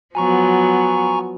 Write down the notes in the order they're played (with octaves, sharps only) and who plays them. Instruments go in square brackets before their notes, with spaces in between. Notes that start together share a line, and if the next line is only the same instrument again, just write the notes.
[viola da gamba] F3 F#3 B3 [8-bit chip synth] G#5 A#5 C#6